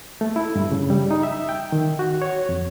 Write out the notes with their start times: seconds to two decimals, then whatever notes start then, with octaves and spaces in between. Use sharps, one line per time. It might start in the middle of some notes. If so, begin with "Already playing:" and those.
0.21 A3
0.36 E4
0.56 G2
0.72 C#3
0.90 G3
1.11 D#4
1.23 E5
1.49 G5
1.72 D#3
1.99 F#4
2.22 C#5
2.49 F2